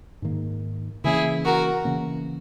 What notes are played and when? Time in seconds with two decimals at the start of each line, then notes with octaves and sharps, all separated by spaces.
0.22 G#2 D#3 A#3
1.04 C#3 E3 A#3 C#4 E4 G#4
1.44 F#4 A#4
1.85 C#3 E3 A#3 C#4